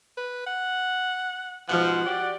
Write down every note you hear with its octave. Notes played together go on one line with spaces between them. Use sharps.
B4
F#5
G#2 B2 F3 F#5
F#4 G4 D5